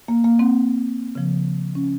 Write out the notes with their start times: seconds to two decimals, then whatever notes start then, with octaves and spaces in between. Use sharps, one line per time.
0.08 A#3
0.24 A#3
0.39 C4
1.15 C#3 F3
1.75 C#4